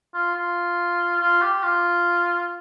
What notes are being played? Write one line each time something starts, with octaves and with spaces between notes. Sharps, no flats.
F4
F4
F4
G4
F4